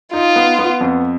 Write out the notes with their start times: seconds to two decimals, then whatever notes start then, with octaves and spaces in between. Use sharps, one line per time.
0.13 D#4 F4
0.36 B3
0.59 B3
0.81 F2